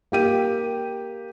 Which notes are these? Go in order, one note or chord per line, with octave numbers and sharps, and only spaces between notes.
A#3 G4 D#7